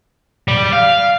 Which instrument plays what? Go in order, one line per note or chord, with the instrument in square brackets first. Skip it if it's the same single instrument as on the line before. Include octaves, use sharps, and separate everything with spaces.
[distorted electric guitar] G3
F5